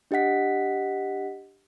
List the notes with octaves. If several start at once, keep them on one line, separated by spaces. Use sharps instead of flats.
D4 G4 D#5 F#5 B6